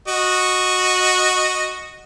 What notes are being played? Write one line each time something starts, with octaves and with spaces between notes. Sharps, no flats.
F#4 D#5